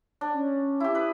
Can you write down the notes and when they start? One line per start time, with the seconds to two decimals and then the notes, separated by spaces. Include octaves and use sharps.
0.21 D4
0.34 C#4
0.80 E4 G4
0.95 B4 D#6